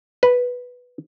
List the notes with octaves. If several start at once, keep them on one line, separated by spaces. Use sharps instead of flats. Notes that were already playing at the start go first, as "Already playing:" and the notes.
B4